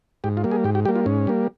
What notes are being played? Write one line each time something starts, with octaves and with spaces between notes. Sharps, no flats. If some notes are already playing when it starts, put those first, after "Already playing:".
G#2 G4
F4
G3 A#3
G#4
G#2 G4
G4
G3 A#3 G4
F4
G#2 C#4
G3 A#3